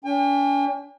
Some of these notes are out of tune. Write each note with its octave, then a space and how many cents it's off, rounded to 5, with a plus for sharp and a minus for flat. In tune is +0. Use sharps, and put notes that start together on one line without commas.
C#4 +45 G5 +45